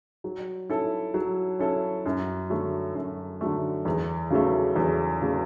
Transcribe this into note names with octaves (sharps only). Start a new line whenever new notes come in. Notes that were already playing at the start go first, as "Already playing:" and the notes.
F#3
C#4 E4 A4
F#3
C#4 E4 A4
F#2
D3 F#3 A3
F#2
D3 F#3 A3
E2
C#3 F#3 A3
E2
C#3 F#3 A3